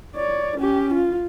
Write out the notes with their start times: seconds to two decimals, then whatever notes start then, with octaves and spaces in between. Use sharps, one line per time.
0.16 C#5 D5
0.58 C#4 G4
0.94 F4